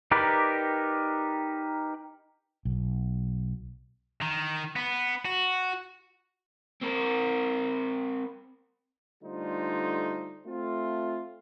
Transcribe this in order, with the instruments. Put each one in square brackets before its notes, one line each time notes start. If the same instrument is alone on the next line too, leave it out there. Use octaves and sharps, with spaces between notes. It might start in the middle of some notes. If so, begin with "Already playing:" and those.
[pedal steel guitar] D#4 G4 A#4 B4 D5
[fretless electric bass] B1
[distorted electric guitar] D#3
B3
F#4
[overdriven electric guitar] C4 A#4
[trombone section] D3 G3 A3 D#4 F4 C5
A3 C4 F4